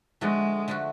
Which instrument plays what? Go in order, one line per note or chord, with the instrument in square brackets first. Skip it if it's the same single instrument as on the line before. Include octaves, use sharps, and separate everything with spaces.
[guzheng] D3 F3 A3 D4 F#4 [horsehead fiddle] G#3
[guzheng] D3 F3 A3 D4 F#4